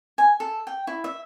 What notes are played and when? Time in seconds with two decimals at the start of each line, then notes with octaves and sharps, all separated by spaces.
0.18 G#5
0.40 A4
0.67 G5
0.87 E4
1.04 E5